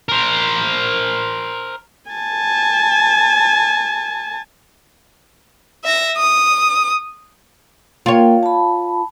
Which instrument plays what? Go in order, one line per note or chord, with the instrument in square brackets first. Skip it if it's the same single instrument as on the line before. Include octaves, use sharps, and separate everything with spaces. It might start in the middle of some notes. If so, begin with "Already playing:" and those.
[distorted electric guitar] A#4 C5
[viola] G#5 A5
[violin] E5 A#6
D#6
[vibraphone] A#3 A#4 G5 [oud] F4 C#5
[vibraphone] A5 B5